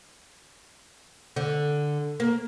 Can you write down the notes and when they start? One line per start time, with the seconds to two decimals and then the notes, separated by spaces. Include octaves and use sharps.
1.36 D3
2.20 A#3